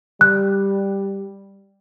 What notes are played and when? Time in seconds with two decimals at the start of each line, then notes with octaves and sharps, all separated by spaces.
0.21 G3 F#6